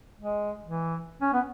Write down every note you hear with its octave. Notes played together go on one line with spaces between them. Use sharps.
G#3
E3
C#4
B3